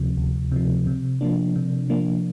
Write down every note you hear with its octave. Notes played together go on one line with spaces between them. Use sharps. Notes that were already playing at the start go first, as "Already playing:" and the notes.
Already playing: D2 C3 F3
D2
C3 F3
C3
F3 A#3 D4
C3
F3 A#3 D4